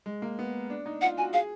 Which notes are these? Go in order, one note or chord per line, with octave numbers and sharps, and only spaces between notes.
G#3
A#3
B3
D4
D#4
F4 F#5
F#4 G#5
G#4 F5